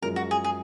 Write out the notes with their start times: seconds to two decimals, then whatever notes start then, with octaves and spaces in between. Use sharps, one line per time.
0.02 F#2 F3 G#3 A#4
0.16 F#4
0.31 G#4
0.44 G#4